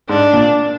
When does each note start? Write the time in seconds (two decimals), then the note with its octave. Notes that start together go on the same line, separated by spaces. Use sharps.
0.09 G#2 D4
0.33 A#2